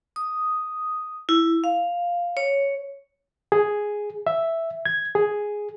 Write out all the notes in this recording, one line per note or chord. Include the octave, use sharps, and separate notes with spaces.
D#6
E4
F5
C#5
G#4
E5
G#6
G#4